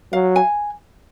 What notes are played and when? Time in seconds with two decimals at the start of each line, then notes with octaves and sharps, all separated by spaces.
0.12 F#3 F5
0.36 G#5